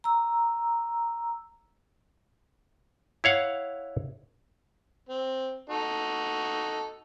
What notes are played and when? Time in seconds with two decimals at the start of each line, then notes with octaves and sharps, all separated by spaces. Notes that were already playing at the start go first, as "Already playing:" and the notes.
0.04 A#5 E6
3.24 E4 C#5 F5 F#5
5.09 C4
5.70 D#4 F#4 A4